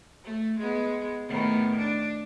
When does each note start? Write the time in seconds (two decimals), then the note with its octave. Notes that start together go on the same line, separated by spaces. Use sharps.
0.23 A3
0.59 G#3 B3
1.28 A2 D#3 B3
1.77 D4